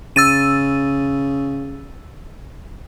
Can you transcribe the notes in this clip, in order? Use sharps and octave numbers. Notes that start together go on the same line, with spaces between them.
C#3 E6 A6 D#7